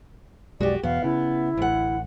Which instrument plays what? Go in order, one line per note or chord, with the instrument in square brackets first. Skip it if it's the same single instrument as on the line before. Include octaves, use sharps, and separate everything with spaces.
[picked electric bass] B1 F2 G#3 [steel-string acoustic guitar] F#4 G4 [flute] D5
[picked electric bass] E2 B2 [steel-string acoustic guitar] B3 [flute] F5
[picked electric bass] C#3 [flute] E4
[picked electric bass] A1 [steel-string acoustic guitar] D2 F#5